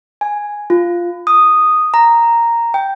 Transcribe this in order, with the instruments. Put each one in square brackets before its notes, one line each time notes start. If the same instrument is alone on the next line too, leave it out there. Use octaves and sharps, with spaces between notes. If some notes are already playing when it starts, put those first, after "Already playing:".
[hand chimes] G#5
F4
D#6
A#5
G5